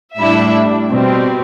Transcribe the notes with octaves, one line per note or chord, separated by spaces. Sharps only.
A2 G3 D4 E4 E5
B2 G3 C4